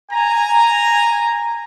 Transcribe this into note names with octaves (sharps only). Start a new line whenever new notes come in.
G#5 A#5